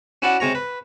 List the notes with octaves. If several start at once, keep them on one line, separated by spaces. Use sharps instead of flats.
C#4 E4 F#4 D5 F#5
C3 G#3 C#5 A#5
B4